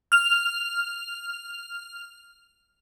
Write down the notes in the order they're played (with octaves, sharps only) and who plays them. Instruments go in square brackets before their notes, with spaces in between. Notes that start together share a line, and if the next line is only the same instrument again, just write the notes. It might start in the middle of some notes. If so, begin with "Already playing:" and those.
[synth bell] F6 F7